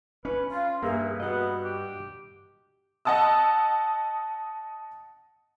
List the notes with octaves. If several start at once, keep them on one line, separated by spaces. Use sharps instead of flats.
C#4 B4
F4 F5
G2 A#3 G#4 E5
B3 F#4 D#5 F#5
G4
D#5 F#5 A5 D#6 E6